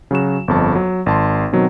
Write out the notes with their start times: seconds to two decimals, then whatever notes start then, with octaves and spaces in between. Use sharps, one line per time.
0.11 C#3 F#3 F#4 E7
0.48 G1 F2 A5
0.75 F#3
1.06 G#1 A5 C6
1.53 B2 D#3 F#3 C4